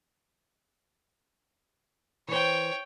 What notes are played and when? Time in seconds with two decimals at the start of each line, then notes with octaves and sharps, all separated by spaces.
2.28 E3 C5 C#5 G5